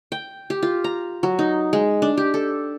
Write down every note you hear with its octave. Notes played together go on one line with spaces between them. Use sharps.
G5
G4
F4
A#5
F#3
D#4
G#3
D4
G4
A4